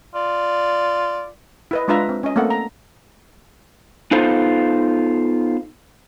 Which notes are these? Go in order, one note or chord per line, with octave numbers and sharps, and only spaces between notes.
F4 D5
E4 B4 D#5
G#3 D4 F4 B4 E5 A#5
C4
C#4 D#5
A3 A#3 C4 A4 F#5
A#5
B3 D#4 F4 A4 C5